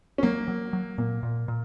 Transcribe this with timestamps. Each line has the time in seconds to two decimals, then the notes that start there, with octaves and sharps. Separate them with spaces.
0.18 C#4
0.23 F#3 A#3
0.48 F#3
0.73 F#3
0.98 A#2 A#3
1.23 A#2
1.48 A#2